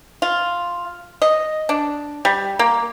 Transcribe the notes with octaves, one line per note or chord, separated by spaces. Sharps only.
F4
D#5
D4
G3
A#3